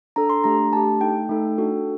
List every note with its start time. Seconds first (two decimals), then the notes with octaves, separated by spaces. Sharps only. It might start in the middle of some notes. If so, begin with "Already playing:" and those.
0.16 D4 A4 A#5
0.30 C6
0.44 A3 D4 G4 A#5
0.73 A3 D4 G4 A5
1.01 A3 D#4 A4 G5
1.29 A3 D#4 A4
1.58 D4 F#4 A4